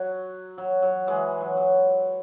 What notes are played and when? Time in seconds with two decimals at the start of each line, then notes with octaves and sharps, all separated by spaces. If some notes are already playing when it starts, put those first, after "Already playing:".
Already playing: F#3
0.58 F#3
0.82 F#3
1.07 E3 G#3
1.41 F#3
1.57 F#3